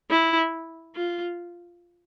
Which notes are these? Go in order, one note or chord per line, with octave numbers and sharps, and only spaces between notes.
E4
F4